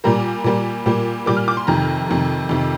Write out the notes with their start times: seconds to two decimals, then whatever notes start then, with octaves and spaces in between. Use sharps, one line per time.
0.04 A#2 G3 A#3 A#5
0.44 A#2 G3 A#3
0.86 A#2 G3 A#3
1.26 A#2 G3 A#3 D6
1.36 F6
1.48 D6
1.57 C6
1.67 F2 C3 D#3 A#5
2.09 F2 C3 D#3
2.49 F2 C3 D#3